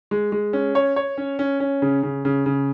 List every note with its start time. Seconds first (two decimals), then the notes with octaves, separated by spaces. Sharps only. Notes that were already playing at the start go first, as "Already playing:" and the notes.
0.11 G#3
0.32 G#3
0.53 C#4
0.75 C#5
0.96 C#5
1.18 C#4
1.39 C#4
1.60 C#4
1.82 C#3
2.03 C#3
2.25 C#3
2.46 C#3